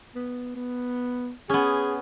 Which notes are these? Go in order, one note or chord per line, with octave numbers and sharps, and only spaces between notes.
B3
B3
B3 C#4 G#4